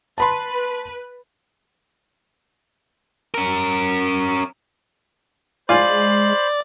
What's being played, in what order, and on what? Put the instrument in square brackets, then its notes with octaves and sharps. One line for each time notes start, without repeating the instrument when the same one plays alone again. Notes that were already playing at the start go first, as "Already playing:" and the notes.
[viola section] B4 [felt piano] A5 B5 C6
[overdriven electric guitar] C#4 A#4
[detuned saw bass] G#3 [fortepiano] F4 G#5 [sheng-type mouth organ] C5 B5 [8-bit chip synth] D5